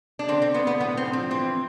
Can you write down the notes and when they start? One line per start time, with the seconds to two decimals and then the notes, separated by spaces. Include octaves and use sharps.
0.19 D4
0.28 D3 C4
0.42 C4
0.54 D3 B3
0.67 B3
0.80 A2 B3
0.97 C4
1.05 F3
1.13 C4
1.30 E3 C4